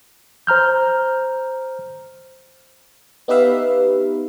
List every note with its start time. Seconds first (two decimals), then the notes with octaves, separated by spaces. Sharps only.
0.47 C5 A#5 F6 G6
3.28 B3 D#4 G4 B4 E5 F5